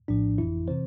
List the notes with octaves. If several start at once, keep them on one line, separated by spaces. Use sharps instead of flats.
A#1 A2 F3 D4
G1 F2 E3 E4
C3 E3 C4 C5